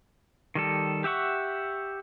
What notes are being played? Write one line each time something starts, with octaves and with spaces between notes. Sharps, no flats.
D#3 G3 A4
G4 E5 F#5 C#6